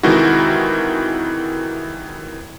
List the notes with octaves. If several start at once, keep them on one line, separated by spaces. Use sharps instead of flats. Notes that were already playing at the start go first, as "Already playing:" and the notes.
C3 D#3 E3 G#3 E4 F#4